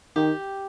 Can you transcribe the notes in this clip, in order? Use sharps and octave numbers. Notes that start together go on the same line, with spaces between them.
D#3 G4